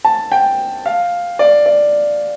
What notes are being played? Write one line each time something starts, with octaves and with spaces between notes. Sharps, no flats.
A5
G5
F5
D5
D5